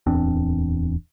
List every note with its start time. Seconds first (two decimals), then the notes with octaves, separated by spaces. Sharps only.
0.07 D1 E2 C4 D4